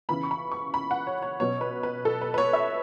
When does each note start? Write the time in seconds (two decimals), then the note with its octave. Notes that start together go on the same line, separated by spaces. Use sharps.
0.09 C#3 E3 B3 B5
0.23 C#6
0.31 B5
0.52 C#6
0.74 B5
0.91 F#5
1.07 C#5
1.22 C#5
1.40 B2 F#3 B3 C#5
1.61 B4
1.83 B4
2.05 A4
2.21 B4
2.34 B4
2.38 C#5
2.53 E5